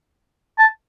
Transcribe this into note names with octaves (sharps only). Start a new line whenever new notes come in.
A5